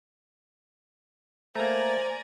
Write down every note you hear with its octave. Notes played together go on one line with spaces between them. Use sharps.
A3 A#3 C5 D5 G#5 A#5